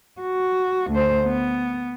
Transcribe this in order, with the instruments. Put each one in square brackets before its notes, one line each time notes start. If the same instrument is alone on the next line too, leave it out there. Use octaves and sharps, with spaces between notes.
[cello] F#4
D2 C5
B3